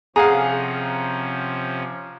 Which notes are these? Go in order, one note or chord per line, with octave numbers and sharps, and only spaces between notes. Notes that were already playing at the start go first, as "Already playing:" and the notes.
C3 F3 C#4 G#4 F5 F#5 A#5